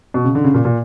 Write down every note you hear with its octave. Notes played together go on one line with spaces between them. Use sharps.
B2
C#3
D3
C#3
A#2
A#2